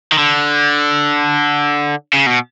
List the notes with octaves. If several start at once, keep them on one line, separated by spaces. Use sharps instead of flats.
D#3
D3
C#3
B2